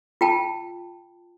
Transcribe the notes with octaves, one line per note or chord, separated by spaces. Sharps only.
F4 G5 A5